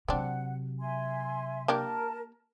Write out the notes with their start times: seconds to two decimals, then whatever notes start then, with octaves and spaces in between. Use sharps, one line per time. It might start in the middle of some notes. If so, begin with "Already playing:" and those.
0.08 C3 F#3 C4 D4 F#5
0.80 E5 G#5 C6
1.68 A#3 D4 G4 A#4 A5